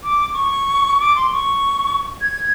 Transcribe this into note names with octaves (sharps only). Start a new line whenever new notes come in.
D6
C#6
D6
C6
C#6
G#6